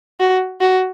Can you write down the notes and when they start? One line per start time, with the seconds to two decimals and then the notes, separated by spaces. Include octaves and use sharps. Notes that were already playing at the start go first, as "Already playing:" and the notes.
0.20 F#4
0.61 F#4